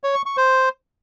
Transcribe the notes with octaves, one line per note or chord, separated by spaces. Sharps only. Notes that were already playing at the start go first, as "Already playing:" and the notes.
C#5
C#6
C#6
C5